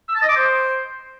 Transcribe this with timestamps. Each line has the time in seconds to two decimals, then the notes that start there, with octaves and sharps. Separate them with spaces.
0.08 E6
0.15 A5
0.22 D#5
0.29 D6
0.36 C5